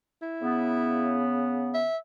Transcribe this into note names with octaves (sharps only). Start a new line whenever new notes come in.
E4
C#3 B3
E5